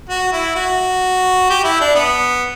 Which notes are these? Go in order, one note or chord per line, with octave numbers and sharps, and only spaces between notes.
F#4
E4
F#4
G4
E4
D4
B3